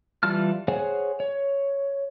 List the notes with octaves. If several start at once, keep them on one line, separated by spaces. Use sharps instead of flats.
E3 G3 F4 A5 F6
G#4 C5 C#5 F#5 G#5
C#5